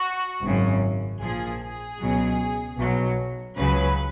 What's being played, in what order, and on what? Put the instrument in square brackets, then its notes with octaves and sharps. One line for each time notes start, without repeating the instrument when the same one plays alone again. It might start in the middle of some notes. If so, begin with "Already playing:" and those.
Already playing: [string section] F#4
G#1 F#2 C#3
A#1 A#2 F3 G#4
G#4
C#2 B2 F#3
B1 B2 F#3
C#2 C#3 F#3 B4